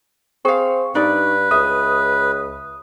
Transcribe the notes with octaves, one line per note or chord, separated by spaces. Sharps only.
C4 G#4 F5 C#6
G2 D#4 B4 D5
C#2 E5 D#6